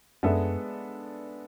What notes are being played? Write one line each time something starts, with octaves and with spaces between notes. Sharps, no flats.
F#2 G#3 B3 D4 A4 E5